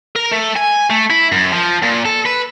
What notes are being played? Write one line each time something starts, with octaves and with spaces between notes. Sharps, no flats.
A#4
A3
G#5
A3
E4
F#2
F3
A#2
A4
B4